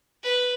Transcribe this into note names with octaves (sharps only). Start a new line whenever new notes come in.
B4